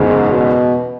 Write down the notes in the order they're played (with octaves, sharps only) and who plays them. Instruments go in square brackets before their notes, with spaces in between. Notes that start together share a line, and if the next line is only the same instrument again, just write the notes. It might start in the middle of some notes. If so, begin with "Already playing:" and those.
Already playing: [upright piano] F#1 E2 C#3 G#3 [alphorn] G#2
[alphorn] B2